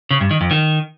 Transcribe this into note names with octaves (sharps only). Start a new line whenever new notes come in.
C#3
G2
D#3
F2
D#3